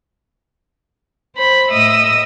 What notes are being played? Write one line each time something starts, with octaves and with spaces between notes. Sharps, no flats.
C5 B5
A2 D#5 E5 D#6 E6